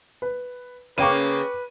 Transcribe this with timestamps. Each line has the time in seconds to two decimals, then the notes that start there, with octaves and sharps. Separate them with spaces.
0.22 B4
0.98 C#3 A#3 B4 C#5 G5 C#6 D6 D#7